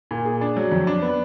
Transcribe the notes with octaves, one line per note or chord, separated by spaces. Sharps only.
A#2
G#4
D4
F#3
F2
D4
B3